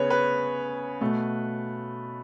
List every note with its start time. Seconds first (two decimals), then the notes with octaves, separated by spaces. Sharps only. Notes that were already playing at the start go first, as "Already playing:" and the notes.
Already playing: C#3 B3 B4 C#5
0.10 B4
1.01 B2 A3